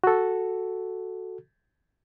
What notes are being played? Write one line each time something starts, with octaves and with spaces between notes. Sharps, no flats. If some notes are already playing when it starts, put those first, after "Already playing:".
F#4 A4